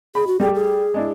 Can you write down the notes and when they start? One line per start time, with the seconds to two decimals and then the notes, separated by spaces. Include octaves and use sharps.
0.15 G#4 B5
0.27 F#4
0.40 G3 A3 G4 G#4
0.55 G#4
0.94 G#3 D4 E4